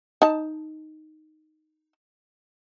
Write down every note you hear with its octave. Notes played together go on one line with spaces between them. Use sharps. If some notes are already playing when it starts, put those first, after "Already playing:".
D#4 A5